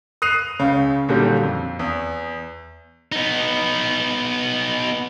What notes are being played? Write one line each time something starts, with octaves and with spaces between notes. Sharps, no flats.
D#6 F#6 C7 D#7 F7
C#2 C#3
A#2 D3 D#3 F#3 G3
F2
E2
B3 D#4